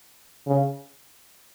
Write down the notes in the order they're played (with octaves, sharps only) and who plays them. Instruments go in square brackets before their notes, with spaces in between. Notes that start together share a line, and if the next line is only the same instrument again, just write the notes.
[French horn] C#3